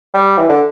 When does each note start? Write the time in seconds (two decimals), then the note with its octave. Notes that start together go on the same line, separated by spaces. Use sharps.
0.14 G3
0.37 E3
0.49 D3